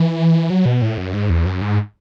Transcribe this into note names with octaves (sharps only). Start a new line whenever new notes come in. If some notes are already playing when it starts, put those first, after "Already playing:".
Already playing: E3
F#3
B2
A2
F#2
G#2
E2
F#2
G#2